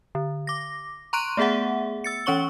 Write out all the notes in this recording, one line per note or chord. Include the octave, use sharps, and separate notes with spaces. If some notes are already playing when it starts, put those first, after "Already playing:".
D3
D6 A#6
A#5 C6 C#6 F#6 D7 D#7
A3 B3 G#4 E5 F#5
E6 A6 C#7
E3 C#4 C#5 C#6 G7